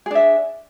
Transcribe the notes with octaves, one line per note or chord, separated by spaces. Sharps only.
D4 G#4 E5